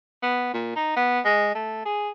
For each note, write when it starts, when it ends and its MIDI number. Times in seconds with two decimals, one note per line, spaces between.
0.22 0.49 59
0.54 0.73 46
0.76 0.95 63
0.97 1.20 59
1.25 1.55 56
1.55 1.81 57
1.85 2.10 68